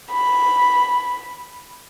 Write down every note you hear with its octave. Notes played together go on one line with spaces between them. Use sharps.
B5